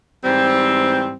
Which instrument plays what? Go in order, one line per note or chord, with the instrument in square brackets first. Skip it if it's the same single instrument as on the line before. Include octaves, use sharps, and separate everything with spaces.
[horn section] G#2 E3 G3 C4